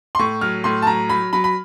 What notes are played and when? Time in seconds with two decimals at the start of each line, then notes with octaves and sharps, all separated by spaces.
0.15 C6
0.19 A2 C#6
0.41 F#3 F6
0.64 A2 C6
0.82 A5
0.87 F#3 A#5
1.09 F#3 B5
1.33 F#3 B5
1.44 B5